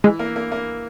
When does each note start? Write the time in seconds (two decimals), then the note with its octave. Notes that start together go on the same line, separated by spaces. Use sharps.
0.04 E3 G#3
0.19 A#3
0.36 A#3
0.52 A#3